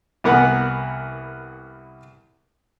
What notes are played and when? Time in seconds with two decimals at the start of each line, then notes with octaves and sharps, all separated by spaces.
0.24 C2 E3 B3 A#4 F#5